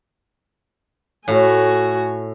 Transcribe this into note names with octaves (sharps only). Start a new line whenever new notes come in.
A2 F#4 G#5